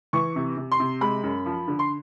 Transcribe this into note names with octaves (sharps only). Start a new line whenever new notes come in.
E3 C#6
C3
C3
C6
C3
G#3 B5
F#2
F3
D3
C6